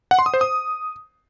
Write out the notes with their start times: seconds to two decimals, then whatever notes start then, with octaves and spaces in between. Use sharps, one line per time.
0.11 F#5
0.19 C6
0.26 D#6
0.34 C5
0.41 D#6